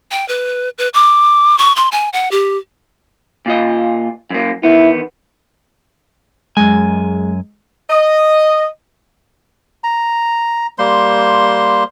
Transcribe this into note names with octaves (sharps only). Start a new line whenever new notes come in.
G5
B4
B4
D6
C#6
C6
G#5
F#5
G4
A#2 F4 D#5
F#2 A#3
E2 D#3 B3 E4
F#2 G#3 G#5
D#5
A#5
G3 A#3 C5 C6